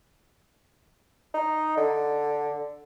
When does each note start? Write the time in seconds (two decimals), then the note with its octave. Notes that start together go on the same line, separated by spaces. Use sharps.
1.34 D#4
1.77 D3